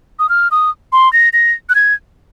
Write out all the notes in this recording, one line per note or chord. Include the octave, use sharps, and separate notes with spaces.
D#6
F6
D#6
C6
A#6
A#6
F#6
G#6